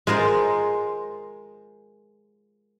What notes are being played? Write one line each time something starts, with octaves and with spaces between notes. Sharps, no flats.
G#3 F4 A#4 C5